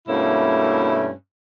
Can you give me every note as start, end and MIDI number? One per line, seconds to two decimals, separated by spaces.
0.08 1.10 43
0.08 1.10 47
0.08 1.10 57
0.08 1.10 58
0.08 1.10 61
0.08 1.10 64